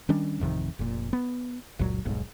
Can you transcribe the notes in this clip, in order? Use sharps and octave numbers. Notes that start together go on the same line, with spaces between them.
D#3 G3 C#4 D4
A1 F2 C3 D#3
F1 A#2
B3
F#1 C#2 A#2 F#3
D#1 B1 G#2